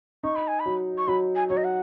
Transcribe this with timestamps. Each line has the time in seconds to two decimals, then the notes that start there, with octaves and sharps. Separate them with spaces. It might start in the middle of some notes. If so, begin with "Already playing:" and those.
0.23 D#4 C#6
0.36 B5
0.48 G#5
0.60 B5
0.66 F#3
0.98 C#6
1.08 F#3 B5
1.36 G#5
1.49 F#3 C#5
1.57 D#5
1.64 F#5